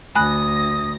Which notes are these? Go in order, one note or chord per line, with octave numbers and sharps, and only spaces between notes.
D2 G#5 B5 D#6 F#6 A#6